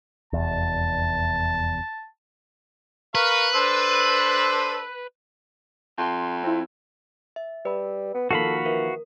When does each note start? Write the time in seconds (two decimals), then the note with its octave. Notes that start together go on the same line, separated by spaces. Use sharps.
0.33 F1 E2 A5
3.15 A#4 B4 F5 C#6
3.54 D4 A4 C5 E6
5.98 F2 C6
6.43 C4 E4
7.36 E5
7.65 G3 B4 B5
8.15 B3
8.31 D#3 F3 A#3 F#4 A4 F5 B5
8.66 E3 A#4